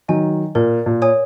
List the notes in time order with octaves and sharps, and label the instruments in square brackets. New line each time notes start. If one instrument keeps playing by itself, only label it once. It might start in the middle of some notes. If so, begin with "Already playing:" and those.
[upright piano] D#3 F#3 [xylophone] D#5 G#5
[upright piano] A#2 [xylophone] A#4
[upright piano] A#2
[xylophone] C#5 G#5 D#6